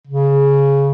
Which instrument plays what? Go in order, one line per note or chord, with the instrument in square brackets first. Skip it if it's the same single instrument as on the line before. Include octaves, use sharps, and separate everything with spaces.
[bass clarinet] C#3